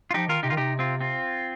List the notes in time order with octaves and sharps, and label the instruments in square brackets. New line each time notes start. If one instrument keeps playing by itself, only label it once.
[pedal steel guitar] F4
[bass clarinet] F3 [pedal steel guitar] D#4 G4
[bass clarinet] D#3 [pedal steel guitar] F4 A#4
[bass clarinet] C3 [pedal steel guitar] D#4 G4
[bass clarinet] D#3 [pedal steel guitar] F4
[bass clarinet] C3 [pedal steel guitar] D#4 G4
[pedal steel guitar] C4 F4
C4 F4